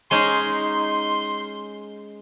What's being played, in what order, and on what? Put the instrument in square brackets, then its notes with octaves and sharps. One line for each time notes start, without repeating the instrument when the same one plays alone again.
[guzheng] G#3 C#4 D#4 [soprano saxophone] C6